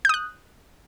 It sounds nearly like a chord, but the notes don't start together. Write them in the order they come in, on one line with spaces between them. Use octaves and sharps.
G6 D#6 F#6